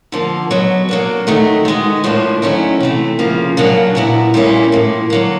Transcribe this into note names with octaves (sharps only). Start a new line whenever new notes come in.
D3 F3 A#3
B2 F#3 B3
F#3 A#3 D4
D#3 F#3 A3
D#3 G#3 B3
A2 F3 A#3 D4
D#3 F#3 A3 C#4 E4
C3 E3 A3
C#3 F3 A#3
C#3 F#3 A#3 D4
A#2 F#3 B3 E4
A#2 G3 A#3 C#4 E4
A2 F3 A#3
D3 F#3 A#3